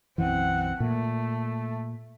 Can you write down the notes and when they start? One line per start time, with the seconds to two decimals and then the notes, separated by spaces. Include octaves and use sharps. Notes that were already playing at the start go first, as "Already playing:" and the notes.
0.18 B1 F#2 E3 C4 F#5
0.80 A#2 A3